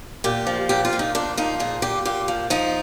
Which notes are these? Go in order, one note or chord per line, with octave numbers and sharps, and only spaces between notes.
A#2 G4
F3
A#2 G4
F4
A#2
D#4
A#2 D4
F3 D#4
A#2 G#4
A#2 G4
A#2 G4
F3
F3 D#4